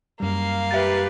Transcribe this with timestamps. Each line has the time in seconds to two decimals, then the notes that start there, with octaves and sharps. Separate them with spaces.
0.20 F#2 G3 A#3 F5
0.71 G4 B4 E5 A6